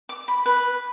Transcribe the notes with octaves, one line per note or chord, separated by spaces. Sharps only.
D6
B5
B4